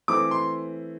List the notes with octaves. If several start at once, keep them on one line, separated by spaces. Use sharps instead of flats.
E3 A3 C4 D6
C6